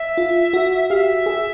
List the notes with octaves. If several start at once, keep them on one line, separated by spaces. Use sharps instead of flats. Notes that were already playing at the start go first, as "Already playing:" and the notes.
Already playing: E5
F4
F#4
G4 E5 F5
G#4